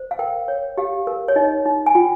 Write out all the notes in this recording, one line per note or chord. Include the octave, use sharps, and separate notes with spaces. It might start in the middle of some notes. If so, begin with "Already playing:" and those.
Already playing: C5
F5
A#4 G5
C#5
G4 F5
A#4
C#5
D#4 D#5
D#4
G#5
F4 G5